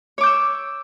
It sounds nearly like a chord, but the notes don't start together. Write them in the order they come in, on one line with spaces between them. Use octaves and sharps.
C#5 D6 G6 E6